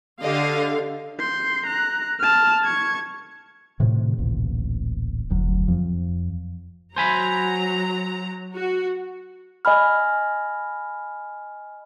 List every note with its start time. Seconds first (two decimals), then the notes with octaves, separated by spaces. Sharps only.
0.21 D3 G4 D#5 F5
1.19 C6 G6
1.66 A#5 F#6
2.19 A5 F6
2.64 C#6 G#6
3.80 A2 C3 D#3
4.18 D1 A1 A#2
5.30 F1 D2 F#3
5.68 F2 F3
6.96 F#3 C5 G#5 A#5 B5
8.56 F#4
9.65 D#5 G#5 B5 F6